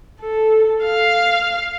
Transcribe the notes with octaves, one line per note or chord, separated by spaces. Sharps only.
A4
F5